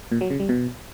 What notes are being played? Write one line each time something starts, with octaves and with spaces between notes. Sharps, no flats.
A#2
F#3
C#3
G3
B2